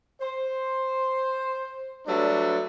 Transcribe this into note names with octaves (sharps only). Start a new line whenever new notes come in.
C5
F#3 G3 A3 D4 B4